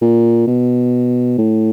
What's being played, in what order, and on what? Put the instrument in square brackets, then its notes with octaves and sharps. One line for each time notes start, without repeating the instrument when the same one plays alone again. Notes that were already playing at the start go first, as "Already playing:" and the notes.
[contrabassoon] A#2
B2
A2